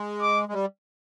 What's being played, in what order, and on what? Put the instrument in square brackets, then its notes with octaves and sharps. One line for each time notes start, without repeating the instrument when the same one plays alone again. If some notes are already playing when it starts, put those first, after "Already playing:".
Already playing: [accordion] G#3
[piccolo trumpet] D6
[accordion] G#3
G3